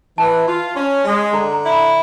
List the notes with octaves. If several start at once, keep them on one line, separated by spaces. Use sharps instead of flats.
E3 A5
F4
C#4
G#3
D3 A#5
A#5
E4
B5